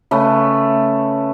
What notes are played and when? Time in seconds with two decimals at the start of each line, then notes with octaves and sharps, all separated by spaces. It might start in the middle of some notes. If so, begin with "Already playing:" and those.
0.11 C#3 A3 B4